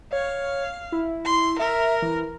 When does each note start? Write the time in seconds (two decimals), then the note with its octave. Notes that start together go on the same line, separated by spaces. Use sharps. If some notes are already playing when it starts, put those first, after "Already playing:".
0.13 C#5 F5
0.92 E4
1.25 C6
1.59 A#4 E5
2.02 E3